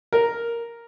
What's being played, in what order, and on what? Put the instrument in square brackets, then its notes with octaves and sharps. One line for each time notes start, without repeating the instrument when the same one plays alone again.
[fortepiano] A#4